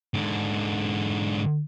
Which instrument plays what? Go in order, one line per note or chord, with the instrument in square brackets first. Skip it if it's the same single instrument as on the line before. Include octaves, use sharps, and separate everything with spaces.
[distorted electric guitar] G#2 D3